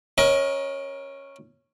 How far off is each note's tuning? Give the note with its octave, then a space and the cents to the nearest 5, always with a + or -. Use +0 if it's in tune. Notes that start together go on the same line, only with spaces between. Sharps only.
C#4 -10 A#4 +25 D#5 +30